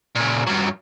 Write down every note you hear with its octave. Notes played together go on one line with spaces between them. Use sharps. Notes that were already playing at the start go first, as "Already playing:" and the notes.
A#2 C#3
G2 F#3